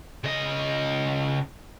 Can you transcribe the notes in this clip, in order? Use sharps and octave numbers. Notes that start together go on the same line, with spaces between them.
C#3 D#5